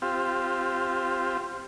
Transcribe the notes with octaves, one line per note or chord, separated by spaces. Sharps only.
C4 F4 G4